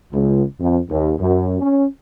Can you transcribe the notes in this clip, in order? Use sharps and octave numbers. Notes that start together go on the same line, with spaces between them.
C#2
F2
D#2
F#2
C#4